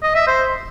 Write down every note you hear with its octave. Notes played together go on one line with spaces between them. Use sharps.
D#5
E5
C5